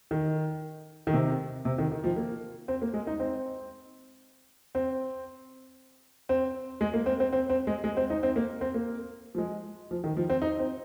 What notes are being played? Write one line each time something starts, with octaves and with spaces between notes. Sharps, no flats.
D#3
D#3
C3
C3
D#3
D#3
F3
A#3
C4
A#3
G#3
D#4
C4
C4
C4
G#3
A#3
C4
C4
C4
C4
G#3
G#3
C4
D#4
C4
A#3
C4
A#3
F3
G#3
F3
D#3
F3
C4
D#4
C4